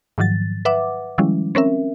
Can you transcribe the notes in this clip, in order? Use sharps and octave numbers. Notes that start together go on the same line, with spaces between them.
G#2 D#3 F3 F#3 A6
B4 E5 F#5 D6
D#3 F3 G3 G#3 C#4 E4
C4 C#4 A#4 E5